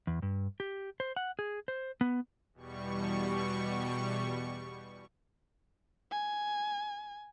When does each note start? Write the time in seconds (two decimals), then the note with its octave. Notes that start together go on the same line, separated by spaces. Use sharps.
0.07 E2
0.22 G2
0.60 G4
1.00 C5
1.16 F#5
1.39 G#4
1.68 C5
2.01 B3
2.54 E2 B2 G3 C#6
6.11 G#5